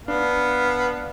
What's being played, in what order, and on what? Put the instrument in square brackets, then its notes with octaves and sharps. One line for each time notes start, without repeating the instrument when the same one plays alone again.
[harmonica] B3 [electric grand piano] D4 [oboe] F5